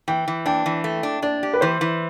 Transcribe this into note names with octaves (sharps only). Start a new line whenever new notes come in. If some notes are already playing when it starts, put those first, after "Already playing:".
E3 G5
E3
D4 G5
E3
A3
D4
D4 D5
G4
B4
E3 C5
E3